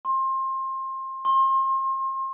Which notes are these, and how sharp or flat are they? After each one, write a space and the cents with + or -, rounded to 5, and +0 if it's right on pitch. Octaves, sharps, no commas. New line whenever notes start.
C6 +25
C6 +35